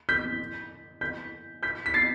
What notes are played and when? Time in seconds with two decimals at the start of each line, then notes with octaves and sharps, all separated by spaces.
0.09 G6 B6
1.01 G6 B6
1.63 G6 B6
1.86 B6
1.94 A6 C7